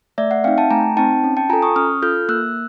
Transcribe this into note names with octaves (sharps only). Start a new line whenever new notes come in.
A3 D5 E5
E5 F#5
C4 D#4 F5 G5
G5 A5
A3 G#5 A#5
C4 D#4 G5 A5
C#4
G5 A5
F4 A4 G#5 A#5
C#6 D#6
C#4 D#6 F6
F4 A4 F6 G6
A#3 E6 F#6